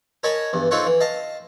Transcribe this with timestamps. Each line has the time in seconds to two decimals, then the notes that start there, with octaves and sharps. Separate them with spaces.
0.23 A#4 C#5 D#5 G#5 A5 B5
0.53 E2 G2
0.71 C4 D#4 F4 A4 C#5 F#5
0.86 E3
1.00 D#5 F5 A5